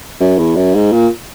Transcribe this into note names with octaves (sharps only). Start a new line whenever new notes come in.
F#2
E2
F#2
G#2
A#2